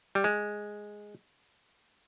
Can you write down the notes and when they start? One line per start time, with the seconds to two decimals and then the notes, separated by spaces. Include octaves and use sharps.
0.15 G3
0.24 G#3